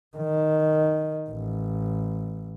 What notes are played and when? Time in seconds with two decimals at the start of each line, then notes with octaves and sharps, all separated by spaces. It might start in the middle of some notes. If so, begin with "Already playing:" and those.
0.17 D#3
1.29 A1